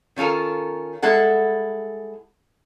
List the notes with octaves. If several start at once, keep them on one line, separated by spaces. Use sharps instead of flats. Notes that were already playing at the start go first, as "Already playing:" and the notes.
D#3 C#4 F4 A4 A#4
G3 G#3 E4 A4 F#5